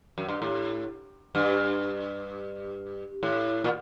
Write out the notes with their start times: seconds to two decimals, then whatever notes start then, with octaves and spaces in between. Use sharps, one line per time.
0.18 F#2
0.29 G2
0.42 A2
1.35 G2
3.23 A2
3.64 A#2